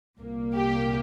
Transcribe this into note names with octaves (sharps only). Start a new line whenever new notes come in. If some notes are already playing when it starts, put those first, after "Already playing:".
C2 A#2 A#3
G4